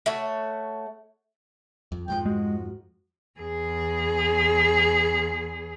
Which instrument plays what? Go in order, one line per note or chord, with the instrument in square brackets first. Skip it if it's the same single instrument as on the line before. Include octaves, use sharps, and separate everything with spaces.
[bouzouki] A3 F#4 C#5
[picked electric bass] F2
[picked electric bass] F2 G#2 F3 [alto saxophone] G5
[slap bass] G#3 [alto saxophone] F#4
[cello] E2 G#4